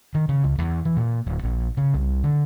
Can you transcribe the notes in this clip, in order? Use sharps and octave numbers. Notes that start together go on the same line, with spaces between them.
D#3
C#3
C#2
E2
E3
A#2
D1
A#1
C#3
C2
D3